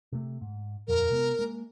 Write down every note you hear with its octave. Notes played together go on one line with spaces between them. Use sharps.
C3 A3
G#2
D#1 F2 A#4
C3 G#3 B3
G#3 A#3